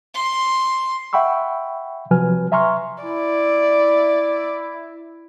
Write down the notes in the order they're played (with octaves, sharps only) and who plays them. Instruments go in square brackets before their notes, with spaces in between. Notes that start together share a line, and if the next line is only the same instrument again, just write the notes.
[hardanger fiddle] C6
[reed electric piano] E5 F#5 G5 B5 C#6 E6
C3 F3 F#3 B4 G#5 F6
E5 G#5 A#5 C6 C#6 F6
[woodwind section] E4 [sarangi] D5